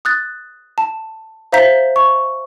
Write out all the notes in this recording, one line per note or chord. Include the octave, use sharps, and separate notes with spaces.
D#6 F#6 A6
A5
C5 E5 F5 A#5 G6 B6
C#6